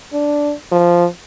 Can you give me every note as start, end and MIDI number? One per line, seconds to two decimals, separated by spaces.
0.13 0.53 62
0.72 1.06 53